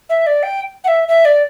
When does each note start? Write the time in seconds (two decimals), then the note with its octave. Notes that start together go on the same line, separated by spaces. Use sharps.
0.09 E5
0.26 D5
0.43 G5
0.84 F#5
0.88 E5
1.08 E5
1.25 D5